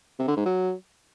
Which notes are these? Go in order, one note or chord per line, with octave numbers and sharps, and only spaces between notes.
C3
D3
G#2
F#3